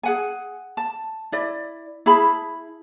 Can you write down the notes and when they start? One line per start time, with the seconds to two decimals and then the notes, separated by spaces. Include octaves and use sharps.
0.03 G#4 F#5 G#5
0.77 A5
1.32 E4 D5
2.06 E4 G#4 A5 B5